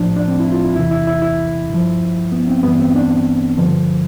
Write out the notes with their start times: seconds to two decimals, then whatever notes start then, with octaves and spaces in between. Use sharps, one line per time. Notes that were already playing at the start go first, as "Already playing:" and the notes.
Already playing: A2 F3 D4
0.16 D4
0.28 C4
0.40 E4
0.52 F4
0.64 E4
0.76 E2 C3 E3 E4
0.91 E4
1.07 E4
1.22 E4
1.70 G2 F3
2.32 B3
2.48 C4
2.63 G2 E3 B3
2.80 C4
2.96 D4
3.57 G2 D3 F3